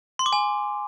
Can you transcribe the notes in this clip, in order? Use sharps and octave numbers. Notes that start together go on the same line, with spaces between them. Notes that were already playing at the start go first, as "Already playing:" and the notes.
C6
D6
G#5